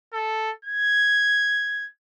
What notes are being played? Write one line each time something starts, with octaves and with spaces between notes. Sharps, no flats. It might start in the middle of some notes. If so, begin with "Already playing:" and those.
A4
G#6